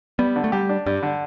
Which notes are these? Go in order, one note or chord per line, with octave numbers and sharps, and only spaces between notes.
G3 B3
D3
A3
G3 G4
D4
G2 G3
D3